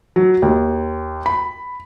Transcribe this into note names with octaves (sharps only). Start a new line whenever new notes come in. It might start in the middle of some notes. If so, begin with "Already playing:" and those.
F#3
D#2
B5